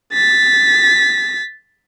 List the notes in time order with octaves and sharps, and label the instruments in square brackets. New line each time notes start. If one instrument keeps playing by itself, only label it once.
[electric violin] A6 B6